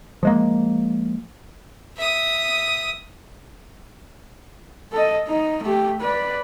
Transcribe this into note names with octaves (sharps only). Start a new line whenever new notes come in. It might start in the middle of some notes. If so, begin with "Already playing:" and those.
F3 G#3 A#3
E5 D#6
A4 D#5
D#4
A3 G4
B4 D5